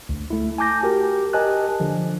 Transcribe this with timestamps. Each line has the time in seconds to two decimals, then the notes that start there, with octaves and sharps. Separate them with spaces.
0.09 D2
0.30 A3 E4
0.58 G#5 A5 D6 G6 A#6
0.83 F#4 G4 A#4
1.33 G4 A#4 D#5 G#5 A5 F#6
1.80 D3 F3